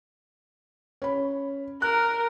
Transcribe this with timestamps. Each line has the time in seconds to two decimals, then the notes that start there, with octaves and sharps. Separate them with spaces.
1.02 C#4 B5
1.82 A#4 F#6